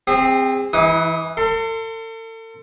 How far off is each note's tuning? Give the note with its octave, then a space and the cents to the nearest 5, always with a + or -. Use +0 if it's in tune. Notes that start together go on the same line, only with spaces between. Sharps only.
C4 +0 G#4 -35
E3 +0 E4 -45 D#6 +0
A4 +40 C6 -10